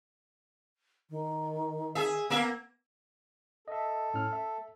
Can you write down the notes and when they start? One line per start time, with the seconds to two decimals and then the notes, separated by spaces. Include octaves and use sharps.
1.10 D#3
1.95 G#4 E5
2.30 A#3 B3 A#4 E5
3.68 A4 D#5 E5
4.14 A2 C#4 F6
4.33 E5